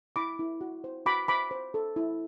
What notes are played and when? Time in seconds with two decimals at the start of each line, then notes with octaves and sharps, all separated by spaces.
0.16 E4 B5 D6
0.39 E4
0.61 F#4
0.84 C5
1.06 F#4 B5 D6
1.28 C5 B5 D6
1.51 C5
1.74 A4
1.96 E4